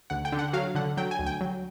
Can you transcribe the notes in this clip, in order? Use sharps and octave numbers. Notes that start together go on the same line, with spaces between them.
D2 F#5
G5
D3
F#5
F#3 F5
D3 F#5
F#3 G5
G#5
D2
G5
F#3